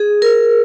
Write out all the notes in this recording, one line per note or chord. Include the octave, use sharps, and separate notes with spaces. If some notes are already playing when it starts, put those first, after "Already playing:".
Already playing: G#4
A#4